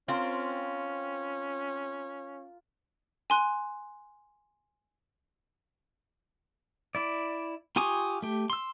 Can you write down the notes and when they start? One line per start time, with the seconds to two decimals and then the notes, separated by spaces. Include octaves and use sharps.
0.08 C4 C#4 F4 A#4
3.30 G#5 C6 F#6
6.95 E4 D5
7.76 F4 G4 G#5 C#6 D#6
8.22 A3 G4
8.50 C6 E6